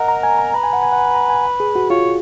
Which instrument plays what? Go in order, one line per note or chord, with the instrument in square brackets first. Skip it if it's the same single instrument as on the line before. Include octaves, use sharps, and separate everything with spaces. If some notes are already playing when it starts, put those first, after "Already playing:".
Already playing: [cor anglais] A#4 [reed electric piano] D#5 F#5
[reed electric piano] A#5
G#5
A#5
[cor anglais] B4 [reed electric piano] A#5
[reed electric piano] G#5
F#5
G#5
F#5
G#5
A#5
G#5
G#4
F#4
[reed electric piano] F4 [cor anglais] C#5